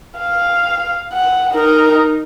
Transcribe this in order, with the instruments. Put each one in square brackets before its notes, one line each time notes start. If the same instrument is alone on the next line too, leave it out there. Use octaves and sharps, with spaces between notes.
[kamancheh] F5
F#5
D#4 A#4